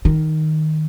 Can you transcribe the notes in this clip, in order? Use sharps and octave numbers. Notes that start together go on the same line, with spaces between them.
D#3